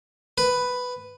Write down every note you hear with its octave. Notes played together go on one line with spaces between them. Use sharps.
B4